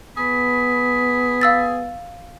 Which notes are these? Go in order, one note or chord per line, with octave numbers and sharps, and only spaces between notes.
B3 G#4 B5
F5 E6 A6